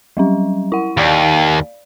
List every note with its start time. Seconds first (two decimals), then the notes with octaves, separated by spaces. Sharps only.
0.17 F#3 G3 C#4
0.72 E4 F#5
0.97 D#2 D5 F5